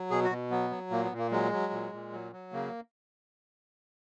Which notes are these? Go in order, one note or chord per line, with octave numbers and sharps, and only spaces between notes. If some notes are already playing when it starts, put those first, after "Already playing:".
Already playing: F#3
B2 G#4
F#4
B2
F#3 B3
F#3
A#2 A#3
B3
A#2
A#3
F#3 G#3
F#3
A#2
A#2
F#3
F#3
C#3 A#3